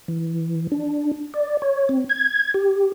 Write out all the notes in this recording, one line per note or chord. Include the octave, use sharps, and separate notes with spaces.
E3
D4
D5
C#5
C4
G#6
G4